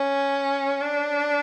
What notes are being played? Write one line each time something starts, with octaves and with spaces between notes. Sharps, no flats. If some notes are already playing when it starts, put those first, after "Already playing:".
Already playing: C#4
D4